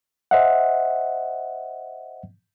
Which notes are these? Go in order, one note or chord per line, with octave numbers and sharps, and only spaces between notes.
C5 D#5 E5 F#5